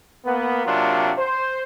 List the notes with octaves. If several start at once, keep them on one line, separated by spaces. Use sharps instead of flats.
A#3 B3
C3 F#3 A#3 D4 F4
C5